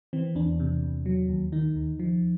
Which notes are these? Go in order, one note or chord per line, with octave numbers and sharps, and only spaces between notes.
E3 C4
E2 D4
C3
E2
F#3
D#2
D#3 D#4
D#2
F3